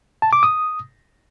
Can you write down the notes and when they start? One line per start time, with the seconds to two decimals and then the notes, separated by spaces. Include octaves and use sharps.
0.22 A5
0.33 D6
0.43 D#6